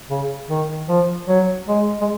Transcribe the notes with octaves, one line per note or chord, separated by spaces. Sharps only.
C#3
D#3
F3
F#3
G#3
G#3